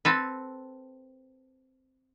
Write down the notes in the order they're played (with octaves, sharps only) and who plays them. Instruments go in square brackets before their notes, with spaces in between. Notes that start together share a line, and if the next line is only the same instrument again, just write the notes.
[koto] C4 A4 B4